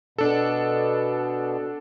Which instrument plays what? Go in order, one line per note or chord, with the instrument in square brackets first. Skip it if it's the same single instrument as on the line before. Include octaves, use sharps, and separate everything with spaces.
[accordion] B2 [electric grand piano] D4 A4